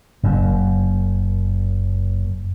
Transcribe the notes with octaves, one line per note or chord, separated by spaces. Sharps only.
F#1 F#2